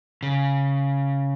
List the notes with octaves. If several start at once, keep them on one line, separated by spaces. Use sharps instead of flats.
C#3